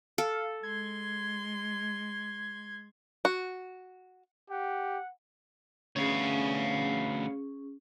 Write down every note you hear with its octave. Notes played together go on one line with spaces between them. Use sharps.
A4 F5
G#3 C6 G#6
F#4
G4 F#5
D2 B3 C#4 G#4 C#5 F5